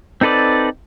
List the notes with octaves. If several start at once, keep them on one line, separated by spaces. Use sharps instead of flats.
C4 D#4 A4 B4 D5